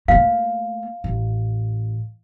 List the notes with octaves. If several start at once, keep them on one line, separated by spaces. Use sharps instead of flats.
A3 A#3 F5
A1